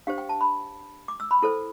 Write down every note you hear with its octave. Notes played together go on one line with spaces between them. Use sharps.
D4 G4 C5 F5
G5
A5
B5
D6
E6
B5
E4 A4 C5